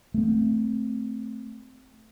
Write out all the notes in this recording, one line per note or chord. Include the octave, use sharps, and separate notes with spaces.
A3 C4